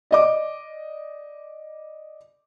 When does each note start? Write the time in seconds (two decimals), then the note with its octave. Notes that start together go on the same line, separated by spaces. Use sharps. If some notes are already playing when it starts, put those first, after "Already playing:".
0.11 D5 D#5 D6